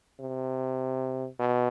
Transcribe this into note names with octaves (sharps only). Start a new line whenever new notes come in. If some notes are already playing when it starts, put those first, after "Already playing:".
C3
B2